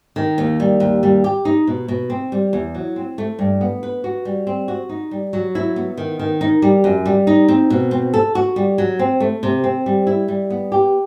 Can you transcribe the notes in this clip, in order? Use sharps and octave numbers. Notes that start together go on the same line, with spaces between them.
D#3
D#2
G3
D#2
G3
G4
D#4
B2
B2
C4
G3
E2
F#3
C4
A3
G2
B3
B4
F#4
G3
C4
F#4
D#4
G3
F#3
E4
B3
D#3
D#3
D#4
G3
F#2
G3
D#4
C4
B2
C4
A4
F#4
G3
F#3
C4
A3
C3
C4
G3
E4
G3
B3
G4